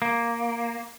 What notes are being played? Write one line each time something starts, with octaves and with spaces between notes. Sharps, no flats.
A#3